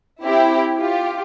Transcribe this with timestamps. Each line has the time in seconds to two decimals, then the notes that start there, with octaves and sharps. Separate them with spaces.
0.24 C4 E4 G4
0.77 F4 G4